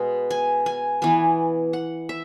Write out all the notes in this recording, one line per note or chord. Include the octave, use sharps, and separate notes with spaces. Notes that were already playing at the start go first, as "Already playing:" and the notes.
Already playing: B2 G#3 B3
G#5
G#5
E3 B3 G#5
F#5
E5